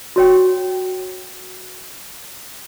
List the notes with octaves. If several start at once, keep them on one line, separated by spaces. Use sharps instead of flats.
F#4 C#5 G5